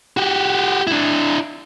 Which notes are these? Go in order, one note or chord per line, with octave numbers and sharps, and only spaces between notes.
F#4 G4
D4 E4